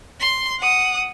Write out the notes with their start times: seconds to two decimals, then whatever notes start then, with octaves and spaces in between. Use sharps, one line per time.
0.20 C6
0.59 F#5 D#6